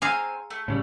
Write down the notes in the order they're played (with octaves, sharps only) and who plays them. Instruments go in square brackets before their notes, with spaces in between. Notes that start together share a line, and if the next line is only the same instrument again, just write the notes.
[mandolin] C4 C#5 G#5 [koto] G#4 F5 A#5
[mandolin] A3
[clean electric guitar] A2 C#3 G3